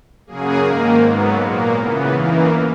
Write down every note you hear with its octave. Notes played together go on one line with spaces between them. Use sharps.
F#2 C#3 F#3 A#3 G#4
G#2 D#3 A#3
G#2 F#3 B3
A#2 A#3 F#4
C#3 E3 B3
F#2 E3 A#3 D#4